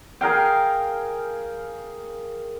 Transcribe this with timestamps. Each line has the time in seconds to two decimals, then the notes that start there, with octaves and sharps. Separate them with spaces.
0.21 G#4 A#4 F5 G5